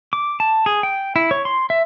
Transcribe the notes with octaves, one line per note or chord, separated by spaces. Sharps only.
D6
A5
G#4
G5
E4
C#5
C6
E5